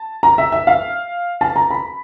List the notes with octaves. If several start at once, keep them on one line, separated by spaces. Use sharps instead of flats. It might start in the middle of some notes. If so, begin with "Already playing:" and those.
Already playing: A5
A#5
E5
E5
F5
A5
A#5
B5